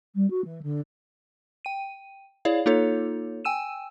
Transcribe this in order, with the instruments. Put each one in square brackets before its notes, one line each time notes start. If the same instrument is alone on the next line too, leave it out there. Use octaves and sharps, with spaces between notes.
[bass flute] G3
F#4
E3
D3
[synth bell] G5 D#7
E4 G#4 C#5 D5 F5
A#3 D#4 F4 A4 C#5
G5 G#5 E6 D#7 E7